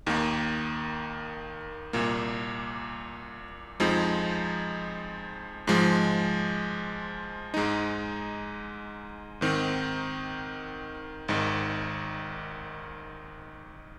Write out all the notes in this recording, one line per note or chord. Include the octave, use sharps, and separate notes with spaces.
D#2 D#3 A#3
C2 A#2 A#3
F2 F3 G#3 D#4
G#2 F3 G#3
G#2 G#3 D#4
G#2 D#3 C4 D#4
G#1 G#2 D#3